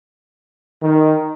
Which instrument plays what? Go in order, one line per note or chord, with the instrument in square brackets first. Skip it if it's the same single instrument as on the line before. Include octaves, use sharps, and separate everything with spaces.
[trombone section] D#3